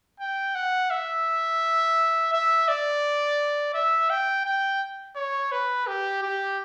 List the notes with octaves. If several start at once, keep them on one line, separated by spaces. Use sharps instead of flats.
G5
F#5
E5
E5
D5
E5
G5
G5
C#5
B4
G4
G4